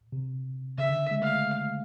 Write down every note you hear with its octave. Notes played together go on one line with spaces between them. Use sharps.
C3
C#3 E5
D3
G#3
A3 F5